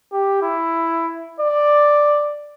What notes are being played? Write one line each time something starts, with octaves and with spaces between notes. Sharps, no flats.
G4
E4
D5